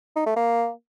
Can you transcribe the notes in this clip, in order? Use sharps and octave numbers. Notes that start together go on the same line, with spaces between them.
D#4
A3
A#3